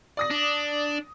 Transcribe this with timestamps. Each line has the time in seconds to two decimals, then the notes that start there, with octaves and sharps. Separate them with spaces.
0.17 D5 D#6 A#6
0.30 D4